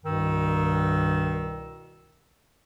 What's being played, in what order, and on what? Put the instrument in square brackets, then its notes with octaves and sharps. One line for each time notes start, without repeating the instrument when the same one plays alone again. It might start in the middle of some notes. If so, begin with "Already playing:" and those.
[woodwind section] C2 G2 B2 D#3 E6